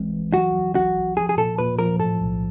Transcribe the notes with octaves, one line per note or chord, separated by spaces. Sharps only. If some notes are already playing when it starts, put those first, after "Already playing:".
Already playing: A1 E3 G#3 C4
E3
F#3 F#4
F#3
A#1 F#4
A#1
F3 G#4
G#4
A#2 A4
A#2 B4
F3 A#4
A2 A4
B1